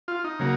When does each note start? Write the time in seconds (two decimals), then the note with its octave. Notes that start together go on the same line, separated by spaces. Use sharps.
0.08 F4
0.24 D#4
0.39 C#3 F#3 A#3